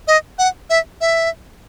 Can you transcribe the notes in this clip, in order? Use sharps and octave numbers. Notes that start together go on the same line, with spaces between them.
D#5
F#5
E5
E5